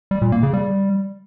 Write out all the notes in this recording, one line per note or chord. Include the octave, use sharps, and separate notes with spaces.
G3
A#2
A#3
C#3
G3